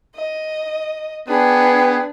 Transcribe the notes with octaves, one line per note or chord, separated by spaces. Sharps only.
D#5
B3 D4 G#4 B4 G5